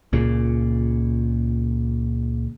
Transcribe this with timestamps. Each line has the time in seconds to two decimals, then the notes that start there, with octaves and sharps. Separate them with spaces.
0.13 C#2 A#2 C#3